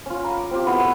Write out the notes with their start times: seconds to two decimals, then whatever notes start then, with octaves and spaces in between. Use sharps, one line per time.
0.06 C#4 F4
0.24 F5 A#5 B5
0.37 D6
0.51 C4 F4 G4
0.66 A3 B3 E4 F#4
0.79 B4 C#5 E5